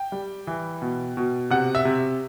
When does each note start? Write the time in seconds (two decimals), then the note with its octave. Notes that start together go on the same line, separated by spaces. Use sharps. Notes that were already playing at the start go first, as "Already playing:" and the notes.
Already playing: G5
0.12 G3
0.47 E3
0.82 B2
1.17 B2
1.50 C3 F#5
1.75 E5
1.85 C3